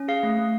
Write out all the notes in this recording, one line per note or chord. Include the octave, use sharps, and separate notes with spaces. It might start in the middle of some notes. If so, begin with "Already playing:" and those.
Already playing: C#4
G#4 F5
A3
A3